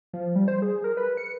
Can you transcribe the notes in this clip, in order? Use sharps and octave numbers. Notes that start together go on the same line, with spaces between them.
F3
G3
C5
G#4
A#4
B4
C#7